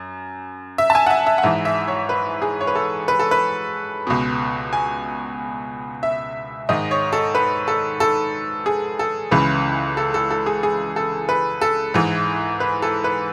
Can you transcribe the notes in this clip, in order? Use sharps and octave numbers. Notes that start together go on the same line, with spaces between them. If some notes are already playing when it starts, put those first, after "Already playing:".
Already playing: F#2
E5
A5
G#5
F#5
E5
E5
F#5
G#2 E3 E5
E5
C#5
B4
G#4
C#5
B4
A4
B4
A4
B4
C#2 B2
G#5
E5
G#2 D#3 D#5
C#5
A4
B4
A4
A4
G#4
A4
C#2 C#3 E3 B4
A4
A4
A4
G#4
G#4
A4
B4
A4
G#2 E3
B4
A4
B4